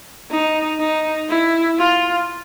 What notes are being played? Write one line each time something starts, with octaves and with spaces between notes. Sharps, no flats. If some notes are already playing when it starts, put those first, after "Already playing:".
D#4
D#4
E4
F4